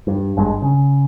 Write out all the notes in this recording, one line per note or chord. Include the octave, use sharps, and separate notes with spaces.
G2
G#1 G2 A#2 G#3
C#3